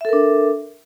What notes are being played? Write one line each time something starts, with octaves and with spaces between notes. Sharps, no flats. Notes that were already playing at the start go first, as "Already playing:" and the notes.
D4 A4 A#4 E5